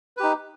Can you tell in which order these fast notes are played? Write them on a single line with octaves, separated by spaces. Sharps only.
B4 G4 D#4